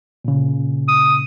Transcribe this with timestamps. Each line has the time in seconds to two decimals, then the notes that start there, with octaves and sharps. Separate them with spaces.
0.25 A#2 C#3
0.88 D#6